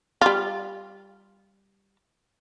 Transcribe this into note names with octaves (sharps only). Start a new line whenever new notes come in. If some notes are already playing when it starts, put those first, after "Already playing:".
G3 F4